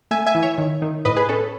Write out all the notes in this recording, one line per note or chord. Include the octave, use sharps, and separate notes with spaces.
A3 E5 G#5
E5 G#5
E3
C#5 E5
D#3
D#3
A2 B4 D#5
G#4 B4
C#4 A4